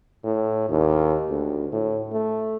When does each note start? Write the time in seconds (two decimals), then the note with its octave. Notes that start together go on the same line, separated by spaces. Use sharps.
0.24 A2
0.69 D#2
1.30 D2
1.72 A2
2.13 A3